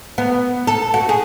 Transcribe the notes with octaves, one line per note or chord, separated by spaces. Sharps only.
B3
A4
F#4
G#4